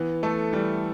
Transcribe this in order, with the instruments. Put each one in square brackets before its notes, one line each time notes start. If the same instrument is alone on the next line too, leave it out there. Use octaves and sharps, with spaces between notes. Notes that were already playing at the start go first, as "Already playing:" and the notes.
Already playing: [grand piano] E3 [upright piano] B3
[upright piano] A3 [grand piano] A4
[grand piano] E3 [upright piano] G3